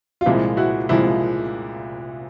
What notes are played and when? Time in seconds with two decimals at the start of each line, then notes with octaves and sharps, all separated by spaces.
0.21 F4
0.26 C2 A#2 F3 G#3 E4
0.57 E4 F#4
0.89 C2 A#2 F3 G#3 E4